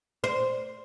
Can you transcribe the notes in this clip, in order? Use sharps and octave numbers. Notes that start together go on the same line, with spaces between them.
C5